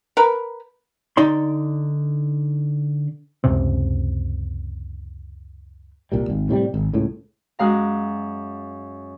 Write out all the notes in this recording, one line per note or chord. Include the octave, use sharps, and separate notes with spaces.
A#4 B4
D3 D#4 D5 C6
C#2 F#2 C3 C4
C2 A#2 G3
G#1
A2 C3 F#3 G3
G#1
C#2 A2
F#2 G#3 F5 A#5